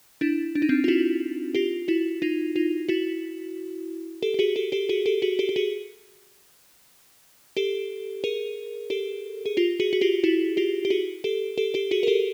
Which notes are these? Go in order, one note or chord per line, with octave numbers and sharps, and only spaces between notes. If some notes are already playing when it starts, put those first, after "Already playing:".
D4 E4
D4
D#4
C4 D4
F4
E4 F#4
F4 G4
E4 F#4
D#4 F4
D#4 F4
E4 F#4
G4 A4
G4
F#4 G#4
G4 A4
G4 A4
F#4 G#4
G4 A4
F#4 G#4
G4 A4
G4
F#4 G#4
G4 A4
G#4 A#4
G4 A4
G#4
F4 G4
F#4 G#4
F#4
F4 G4
E4 F#4
F4 G4
G4
F#4 G#4
G4 A4
G4 A4
G4 A4
F#4 G#4
A#4
G4 A4